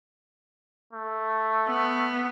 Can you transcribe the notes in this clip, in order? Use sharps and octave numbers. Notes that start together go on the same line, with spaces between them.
A3
B3